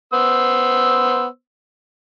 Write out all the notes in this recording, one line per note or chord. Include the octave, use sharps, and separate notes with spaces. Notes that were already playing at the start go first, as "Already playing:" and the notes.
B3 C5 E6